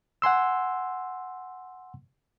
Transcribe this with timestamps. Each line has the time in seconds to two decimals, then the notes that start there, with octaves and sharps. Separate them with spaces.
0.22 F#5 G#5 C6 E6